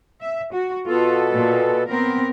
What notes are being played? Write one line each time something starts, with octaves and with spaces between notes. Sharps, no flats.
E5
F#4
B2 B3 F4 A4
A#2
B3 C4 A#4